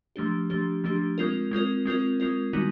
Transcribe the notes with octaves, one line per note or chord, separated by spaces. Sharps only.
F3 A3 D4 G4
F3 A3 D4 G4
F3 A3 D4 G4
G#3 C4 F4 A#4
G#3 C4 F4 A#4
G#3 C4 F4 A#4
G#3 C4 F4 A#4
D#3 G3 B3 D#4 F#4